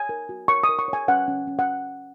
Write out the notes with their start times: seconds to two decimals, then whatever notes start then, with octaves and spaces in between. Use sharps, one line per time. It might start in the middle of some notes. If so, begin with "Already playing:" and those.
Already playing: G#5
0.09 A#4
0.29 F#4
0.48 A#4 C#6
0.64 D#6
0.69 A#4
0.79 C#6
0.88 C#5 G#5
1.08 C#4 F#5
1.28 C#4
1.47 C#4
1.59 F#5